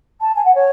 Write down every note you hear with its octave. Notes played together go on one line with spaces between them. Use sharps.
A5
G#5
F#5
C#5